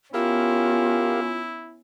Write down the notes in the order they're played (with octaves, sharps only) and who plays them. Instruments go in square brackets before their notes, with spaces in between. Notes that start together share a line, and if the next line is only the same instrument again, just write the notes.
[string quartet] B3 C#4 [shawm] E4 [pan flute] F4 [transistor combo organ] G4 A#4 F5